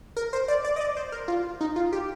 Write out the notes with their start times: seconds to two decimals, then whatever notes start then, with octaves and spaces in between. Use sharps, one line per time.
0.17 A#4
0.33 C5
0.48 D5
0.64 D5
0.76 D#5
0.81 D5
0.97 C5
1.12 A#4
1.28 F4
1.61 D#4
1.76 F4
1.93 G4